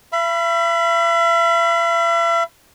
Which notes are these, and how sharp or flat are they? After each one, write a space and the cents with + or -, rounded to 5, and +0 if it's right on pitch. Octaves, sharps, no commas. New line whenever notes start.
E5 +45 B5 +0